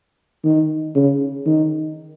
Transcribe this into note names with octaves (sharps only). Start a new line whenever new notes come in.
D#3
C#3
D#3